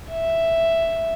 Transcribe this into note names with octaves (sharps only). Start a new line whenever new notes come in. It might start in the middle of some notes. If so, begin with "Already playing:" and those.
E5